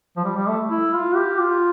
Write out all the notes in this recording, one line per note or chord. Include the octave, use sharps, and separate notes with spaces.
F3
G3
G3
A3
E4
F4
G4
F4